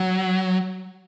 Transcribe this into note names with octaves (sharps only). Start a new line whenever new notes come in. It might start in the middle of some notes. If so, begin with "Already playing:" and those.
Already playing: F#3